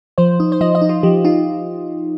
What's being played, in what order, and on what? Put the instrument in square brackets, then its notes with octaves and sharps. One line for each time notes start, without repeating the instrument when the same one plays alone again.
[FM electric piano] F3 [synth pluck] C5
[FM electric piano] D#4
[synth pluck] C5
[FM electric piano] F3 [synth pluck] D#5
[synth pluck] D#5
[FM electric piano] D#4
[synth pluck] F4
[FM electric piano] F3 [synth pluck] G4
[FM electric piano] D#4 [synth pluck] F4